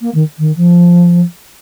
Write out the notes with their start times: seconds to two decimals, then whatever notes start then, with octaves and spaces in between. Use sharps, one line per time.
0.01 A#3
0.14 D#3
0.38 D#3
0.56 F3